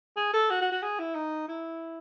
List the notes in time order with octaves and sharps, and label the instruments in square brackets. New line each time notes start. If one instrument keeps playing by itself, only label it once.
[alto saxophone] G#4
A4
F#4
F#4
F#4
G#4
E4
D#4
E4